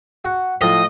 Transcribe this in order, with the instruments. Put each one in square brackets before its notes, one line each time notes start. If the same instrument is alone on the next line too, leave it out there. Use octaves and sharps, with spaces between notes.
[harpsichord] F#4
[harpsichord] A2 F3 [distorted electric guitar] D#5